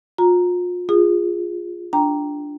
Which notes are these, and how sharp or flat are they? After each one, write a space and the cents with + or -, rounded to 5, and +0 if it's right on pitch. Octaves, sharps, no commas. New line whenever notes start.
F4 +35 A#5 +0
F4 +0 G#4 -15 D#6 -25
D4 +0 G5 +0 A#5 +0